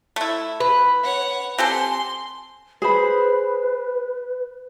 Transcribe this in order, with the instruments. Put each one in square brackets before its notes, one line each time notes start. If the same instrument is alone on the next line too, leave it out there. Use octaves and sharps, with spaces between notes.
[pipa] A3 E4
[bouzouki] B4
[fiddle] C#5 F#5
[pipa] C4 G4 A4 [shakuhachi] G#5 [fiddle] C6
[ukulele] G#4 C5 B5 [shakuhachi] B4